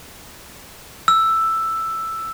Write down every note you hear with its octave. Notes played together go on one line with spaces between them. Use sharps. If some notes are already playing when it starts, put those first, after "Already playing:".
E6